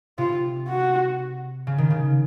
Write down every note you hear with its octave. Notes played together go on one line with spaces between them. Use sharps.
C3 F4
F#4
C#3
D#3
C#3